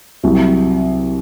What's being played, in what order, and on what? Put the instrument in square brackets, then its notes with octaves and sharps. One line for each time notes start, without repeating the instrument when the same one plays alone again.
[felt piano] C2 C3 F#3